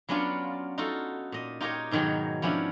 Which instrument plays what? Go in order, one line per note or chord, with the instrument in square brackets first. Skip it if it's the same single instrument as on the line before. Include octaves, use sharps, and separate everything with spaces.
[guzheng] F#3 B3 C#4 D4 F4
D#4 F4 F#4 A4
A#2 D#5
D#4 F4 G4 A#4 C#5 D#5
G#2 B2 D#3 F#3 G#4
F3 B3 C#4 D4 E4